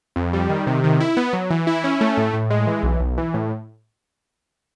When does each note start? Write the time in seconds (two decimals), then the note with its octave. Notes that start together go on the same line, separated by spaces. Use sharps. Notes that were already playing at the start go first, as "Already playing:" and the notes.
0.16 F2
0.33 G3
0.49 D#3
0.67 C3
0.84 D#3
1.00 E4
1.17 B3
1.33 F#3
1.50 E3
1.67 E4
1.84 C#4
2.01 A3
2.17 A2
2.33 A2
2.50 G#3
2.67 E3
2.83 B1
3.00 B1
3.18 E3
3.34 A2